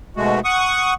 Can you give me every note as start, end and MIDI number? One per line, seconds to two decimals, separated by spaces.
0.17 0.40 44
0.17 0.40 47
0.17 0.40 56
0.17 0.40 57
0.17 0.40 66
0.45 0.94 78
0.45 0.94 85
0.45 0.94 87